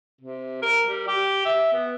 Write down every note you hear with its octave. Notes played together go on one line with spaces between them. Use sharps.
C3
A#4
G3
G4
E5
B3